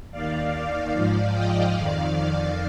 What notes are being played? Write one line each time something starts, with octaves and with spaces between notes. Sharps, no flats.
D#2 D#3 D5 F5
D5 F5
G#2 F3 D5 F5
D#5 G5
F2 D#3 D5 F5